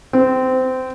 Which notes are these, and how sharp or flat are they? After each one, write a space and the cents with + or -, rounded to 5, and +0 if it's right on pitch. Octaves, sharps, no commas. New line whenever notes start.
C4 -20